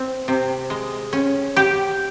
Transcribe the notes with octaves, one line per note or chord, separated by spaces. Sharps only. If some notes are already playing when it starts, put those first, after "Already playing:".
Already playing: C4
C3
G#3
C#4
G4